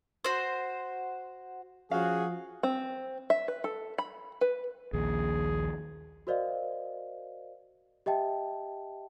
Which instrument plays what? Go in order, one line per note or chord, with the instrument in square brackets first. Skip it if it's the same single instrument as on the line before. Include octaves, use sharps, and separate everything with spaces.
[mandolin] F#4 C5
[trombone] F3 [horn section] C#4 F#4 [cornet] G#4 [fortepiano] F5
[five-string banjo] C4
E5
B4
A4
B5
B4
[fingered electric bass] A#1 D#2 [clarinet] G#4
[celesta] F#4 A#4 C5 D5 D#5 F5
G4 D#5 E5 G5 A5